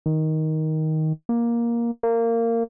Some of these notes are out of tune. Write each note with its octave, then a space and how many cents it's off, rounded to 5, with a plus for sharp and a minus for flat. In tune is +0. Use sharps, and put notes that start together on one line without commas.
D#3 +10
A#3 +10
A#3 -20